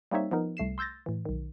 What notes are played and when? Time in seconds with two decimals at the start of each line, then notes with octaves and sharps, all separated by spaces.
0.11 G3 A#3 C4 D#4 C#5 E5
0.31 F3 B3 D#4 A#4
0.57 C2 A3 C7 E7
0.78 C6 E6 G6 A6 A#6
1.06 A2 E3
1.25 B1 D#3